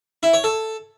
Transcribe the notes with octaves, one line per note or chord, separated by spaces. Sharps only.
E4
C#5
A4